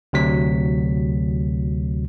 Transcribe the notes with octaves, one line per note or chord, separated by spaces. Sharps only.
D2 C3 F#3 B6